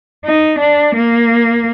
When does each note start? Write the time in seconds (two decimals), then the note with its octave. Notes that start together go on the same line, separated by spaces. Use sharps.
0.23 D#4
0.58 D4
0.93 A#3